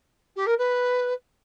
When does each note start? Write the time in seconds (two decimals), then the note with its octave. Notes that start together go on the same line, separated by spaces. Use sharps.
0.36 G4
0.46 A#4
0.58 B4